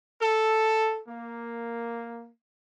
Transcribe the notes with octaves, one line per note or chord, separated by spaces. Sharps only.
A4
A#3